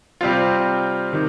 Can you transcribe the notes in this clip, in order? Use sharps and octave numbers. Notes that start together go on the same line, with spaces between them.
C3 G3 C4 F4
C3 D#3